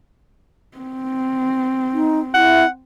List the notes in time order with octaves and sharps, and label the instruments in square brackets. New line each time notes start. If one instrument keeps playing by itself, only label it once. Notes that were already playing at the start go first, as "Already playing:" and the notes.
[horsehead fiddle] C4
[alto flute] D#4
[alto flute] E4 [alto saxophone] F#5